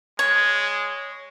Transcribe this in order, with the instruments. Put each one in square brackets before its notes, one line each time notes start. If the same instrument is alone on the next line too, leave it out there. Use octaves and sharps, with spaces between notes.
[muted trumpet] G#3 [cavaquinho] C#5